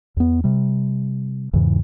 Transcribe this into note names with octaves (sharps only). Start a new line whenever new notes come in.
E2 B3
C3 G3
E2 G#2 C#3 E3